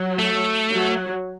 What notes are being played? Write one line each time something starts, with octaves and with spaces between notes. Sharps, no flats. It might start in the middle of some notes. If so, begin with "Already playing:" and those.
Already playing: F#3
A3
F#3